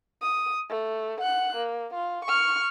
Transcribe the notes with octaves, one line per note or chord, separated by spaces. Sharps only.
D#6
A3
F#5 F#6
A#3
F4
C#6 F6